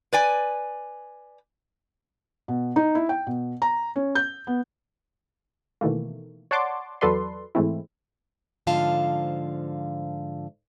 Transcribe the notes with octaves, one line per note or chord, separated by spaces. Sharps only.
B4 D5 G#5
B2
D#4
E4
G5
B2
A#5
C#4
G6
B3
B2 D#3 E3 A3 A#3
C#5 D5 F#5 A5 C6 D6
E2 F#3 A4 B4 D5 C6
G#2 E3 G#3 A3 C4 E4
G#2 D3 F3 F4 F5 A5